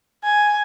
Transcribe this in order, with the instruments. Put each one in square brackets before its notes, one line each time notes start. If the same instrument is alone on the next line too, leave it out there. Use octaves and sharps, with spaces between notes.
[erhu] G#5